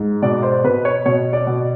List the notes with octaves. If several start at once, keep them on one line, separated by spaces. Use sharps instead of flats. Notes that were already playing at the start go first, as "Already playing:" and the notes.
Already playing: G#2
B2 D5
C5
B2 B4
C#5
B2 C#5
D5
B2